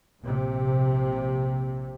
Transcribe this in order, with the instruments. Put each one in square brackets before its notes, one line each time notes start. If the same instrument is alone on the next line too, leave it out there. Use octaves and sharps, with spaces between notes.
[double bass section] A#1 C3